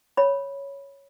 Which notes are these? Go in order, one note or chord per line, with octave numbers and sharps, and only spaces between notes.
C#5 B5